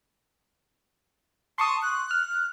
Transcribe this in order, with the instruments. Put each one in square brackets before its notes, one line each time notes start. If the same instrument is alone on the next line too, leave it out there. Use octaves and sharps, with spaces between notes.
[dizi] A5 [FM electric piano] C6 C#6 D#6
[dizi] F#6
[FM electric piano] F6